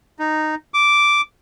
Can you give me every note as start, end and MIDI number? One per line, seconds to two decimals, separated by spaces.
0.19 0.55 63
0.74 1.21 86